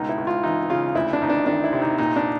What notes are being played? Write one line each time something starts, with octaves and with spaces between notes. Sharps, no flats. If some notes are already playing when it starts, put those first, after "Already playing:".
Already playing: C#2 B2 D#4
E4
C#2
F4
E3 D#4
C#3 F4
D2 E4
D4
D2 D#4
D4
D#3 D4
E4
C3
D#4
A#2 D#4
D4